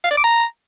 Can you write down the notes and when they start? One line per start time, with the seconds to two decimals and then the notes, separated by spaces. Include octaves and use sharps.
0.04 F5
0.11 D5
0.17 D6
0.24 A#5